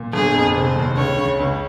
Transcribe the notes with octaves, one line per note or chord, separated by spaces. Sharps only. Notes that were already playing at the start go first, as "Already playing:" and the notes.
Already playing: A#2
G1 G#4
F2
F1 C5
D#2
C#2 C#5
C#3
C#2